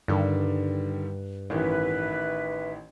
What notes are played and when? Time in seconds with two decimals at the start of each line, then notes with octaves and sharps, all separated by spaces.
0.08 G2 D3 D#3 G3
1.50 A1 D#3 E3 B4 E5